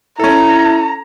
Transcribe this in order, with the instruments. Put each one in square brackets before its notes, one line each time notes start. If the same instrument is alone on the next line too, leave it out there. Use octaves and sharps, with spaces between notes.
[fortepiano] C#4 A4 [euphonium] E4 [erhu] A#5